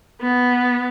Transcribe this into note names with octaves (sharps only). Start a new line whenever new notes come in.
B3